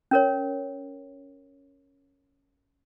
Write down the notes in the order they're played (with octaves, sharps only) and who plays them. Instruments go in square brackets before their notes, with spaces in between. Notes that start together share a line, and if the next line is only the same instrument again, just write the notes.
[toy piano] C#4 A#4 C#5